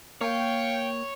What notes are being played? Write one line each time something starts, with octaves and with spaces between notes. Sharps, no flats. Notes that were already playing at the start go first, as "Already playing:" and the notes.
A#3 C#5 F5 G5